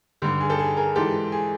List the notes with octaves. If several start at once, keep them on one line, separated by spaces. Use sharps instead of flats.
G2 D3 G4
G#4
G4 A4
G#4
G#4 A#4
G#2 E3 G4 A4
G#4